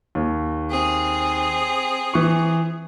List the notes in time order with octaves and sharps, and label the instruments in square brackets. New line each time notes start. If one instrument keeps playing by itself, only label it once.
[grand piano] D#2
[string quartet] C4 G#4
[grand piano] E3 C#6